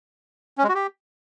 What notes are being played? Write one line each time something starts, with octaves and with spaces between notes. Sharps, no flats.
C#4
G#3
F#4
G4